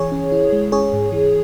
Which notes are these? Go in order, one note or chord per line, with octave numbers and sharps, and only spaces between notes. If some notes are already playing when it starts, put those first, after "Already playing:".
Already playing: E3 G#4 C#5
C#4
E4
G#3
C#4 G#4 C#5
G#2
E3